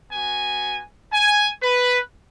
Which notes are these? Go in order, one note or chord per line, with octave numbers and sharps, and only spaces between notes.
B3 F#4 G#5
G#5
B4